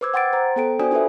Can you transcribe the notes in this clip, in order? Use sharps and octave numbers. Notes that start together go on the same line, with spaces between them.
B4 C5 D6 E6 G#6
F#5 G5 C6 A6 D7
C5 A#5
B3 A4 G5 D7
D4 F#4 C5 D5 G#5 D#6
D4 F4 G4 A4 B4 E5